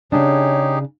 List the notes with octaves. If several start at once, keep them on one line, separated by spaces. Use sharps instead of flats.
C#3 D4 D#4 G4 G#4 C#5